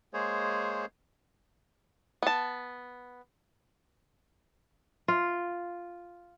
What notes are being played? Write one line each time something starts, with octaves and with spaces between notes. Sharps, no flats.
G#3 A#3 G#4 C5 C#5
B3 A5
F4